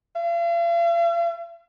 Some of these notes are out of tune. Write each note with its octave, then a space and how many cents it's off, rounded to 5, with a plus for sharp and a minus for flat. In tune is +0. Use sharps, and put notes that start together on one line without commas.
F5 -45